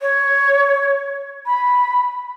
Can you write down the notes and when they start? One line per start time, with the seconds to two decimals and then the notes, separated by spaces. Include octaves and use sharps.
0.01 C#5
1.46 B5